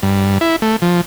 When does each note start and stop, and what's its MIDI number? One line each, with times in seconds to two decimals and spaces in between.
0.03 0.38 43
0.41 0.56 64
0.62 0.76 57
0.82 1.01 53